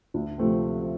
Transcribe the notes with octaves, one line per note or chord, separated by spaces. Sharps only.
D2
C3 F3 A3 C4